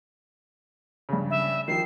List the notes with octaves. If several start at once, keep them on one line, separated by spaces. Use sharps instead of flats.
G2 C#3
E5
D#3 F3 C7